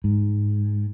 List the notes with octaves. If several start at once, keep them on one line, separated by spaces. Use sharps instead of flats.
G#2